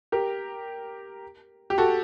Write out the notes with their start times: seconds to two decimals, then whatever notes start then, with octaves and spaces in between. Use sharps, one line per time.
0.12 G4 A#4
1.70 G4
1.78 F#4 A4